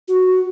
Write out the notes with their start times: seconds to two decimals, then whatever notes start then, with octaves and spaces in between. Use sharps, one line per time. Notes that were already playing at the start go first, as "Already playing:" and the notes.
0.08 F#4